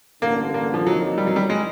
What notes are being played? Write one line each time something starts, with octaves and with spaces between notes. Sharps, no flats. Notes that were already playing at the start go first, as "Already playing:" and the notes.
A1 G2 D3 A#3
A#3
F3
F2 D3 F3 F#3 A#3 D#4
G3
F#3
G3
G#3